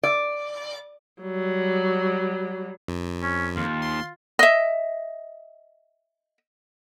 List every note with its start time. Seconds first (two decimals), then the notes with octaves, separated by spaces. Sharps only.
0.03 D5
1.22 F#3 G3
2.88 F2
3.22 C#4
3.57 D#2 F4
3.82 C6
4.39 D#5 E5